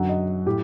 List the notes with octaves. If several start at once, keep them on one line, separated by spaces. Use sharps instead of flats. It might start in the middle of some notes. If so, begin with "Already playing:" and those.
Already playing: F#2 D3 F#3 F#5
D#5
A2 F#3 G4